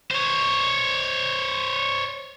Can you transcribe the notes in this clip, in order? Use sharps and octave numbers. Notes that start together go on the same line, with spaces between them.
C5 C#5